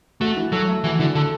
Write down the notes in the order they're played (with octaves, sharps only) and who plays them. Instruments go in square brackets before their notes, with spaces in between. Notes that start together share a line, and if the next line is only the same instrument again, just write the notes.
[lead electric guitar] A3 [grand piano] F#4
[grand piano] E3
[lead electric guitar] F#3 [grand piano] A4
[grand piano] A3
[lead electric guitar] E3 [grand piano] F#4
[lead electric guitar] D3 [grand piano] E3
[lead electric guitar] D3 [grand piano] A4